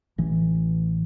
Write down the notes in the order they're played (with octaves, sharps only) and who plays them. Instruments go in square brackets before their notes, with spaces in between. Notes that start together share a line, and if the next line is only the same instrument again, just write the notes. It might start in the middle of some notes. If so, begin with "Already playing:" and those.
[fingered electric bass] A1 E3